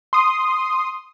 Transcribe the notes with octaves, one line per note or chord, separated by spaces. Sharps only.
C6 D#6